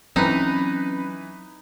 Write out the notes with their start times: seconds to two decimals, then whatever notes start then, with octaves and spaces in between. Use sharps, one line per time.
0.16 E3 F#3 C4 C#4 D#4 B4